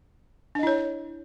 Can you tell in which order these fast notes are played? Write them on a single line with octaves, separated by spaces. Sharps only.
D4 D#5 E4 C#5